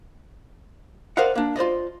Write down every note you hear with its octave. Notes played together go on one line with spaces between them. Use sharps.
A#4 C5 D5 D#5 F5 F#5
A#3 D4
F4 C5 D5 D#5